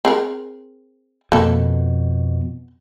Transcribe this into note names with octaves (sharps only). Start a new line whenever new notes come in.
C4 G#4 A#4
F2 B2 A#3 A4